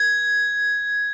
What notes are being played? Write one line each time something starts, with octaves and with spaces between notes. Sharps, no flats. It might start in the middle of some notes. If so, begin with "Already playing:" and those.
Already playing: G#6